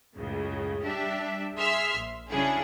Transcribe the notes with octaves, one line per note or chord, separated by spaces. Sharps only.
C#2 F#2 A2 C#3
G3 D4 G4 E5
G#4 E5 C6 E6 F6
A#1
C#3 F#3 C#4 D4 E4 G#4